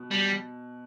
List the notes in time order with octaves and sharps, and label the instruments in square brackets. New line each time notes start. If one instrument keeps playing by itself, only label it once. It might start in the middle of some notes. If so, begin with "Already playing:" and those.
Already playing: [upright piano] B2
[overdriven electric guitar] G3